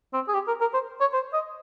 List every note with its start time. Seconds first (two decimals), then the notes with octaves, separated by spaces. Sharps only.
0.13 C4
0.28 G#4
0.34 G4
0.47 A#4
0.61 A#4
0.74 C5
1.00 C#5
1.13 C5
1.33 D#5